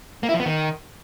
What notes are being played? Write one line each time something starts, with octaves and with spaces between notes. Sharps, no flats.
A#3
E4
F3
B3
D#3